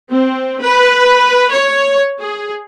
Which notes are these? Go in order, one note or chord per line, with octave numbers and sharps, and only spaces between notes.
C4
B4
C#5
G#4